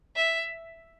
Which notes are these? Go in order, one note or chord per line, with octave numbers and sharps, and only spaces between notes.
E5